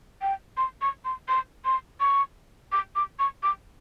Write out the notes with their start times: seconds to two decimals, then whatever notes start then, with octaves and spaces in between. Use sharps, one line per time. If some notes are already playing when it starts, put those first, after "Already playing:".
0.22 G5
0.57 C6
0.81 C#6
1.05 C6
1.29 C6
1.65 C6
2.00 C#6
2.72 D6
2.96 D6
3.19 C#6
3.43 D6